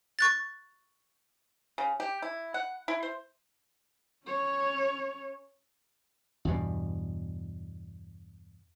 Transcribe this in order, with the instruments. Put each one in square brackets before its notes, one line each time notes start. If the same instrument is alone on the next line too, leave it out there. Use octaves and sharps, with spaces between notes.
[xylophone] C#6 F#6 A6
[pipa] C#3
G4
E4
F#5
E4
C5
[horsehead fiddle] C#4 C#5
[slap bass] E2 G2 B2